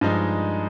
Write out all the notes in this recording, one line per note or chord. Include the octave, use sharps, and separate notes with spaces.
G2 F3 G#3 D#4